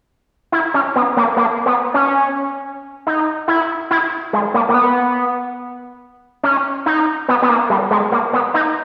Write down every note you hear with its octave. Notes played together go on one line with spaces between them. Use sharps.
E4
C#4
B3
A#3
A#3
B3
C#4
D#4
E4
E4
G#3
A#3
A#3
B3
C#4
D#4
B3
B3
A#3
G3
G#3
A#3
B3
D#4